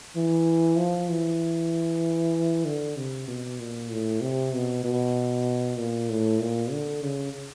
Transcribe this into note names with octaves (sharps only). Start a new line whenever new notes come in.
E3
F3
E3
D3
C3
B2
A#2
A2
C3
B2
B2
A#2
A2
A#2
D3
C#3